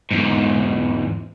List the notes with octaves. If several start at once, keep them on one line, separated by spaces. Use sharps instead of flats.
E2 G#2